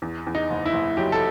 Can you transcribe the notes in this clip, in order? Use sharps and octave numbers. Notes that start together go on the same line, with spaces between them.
E2
E2
D#4
F#1
E4
F#1
F#3 G4
A4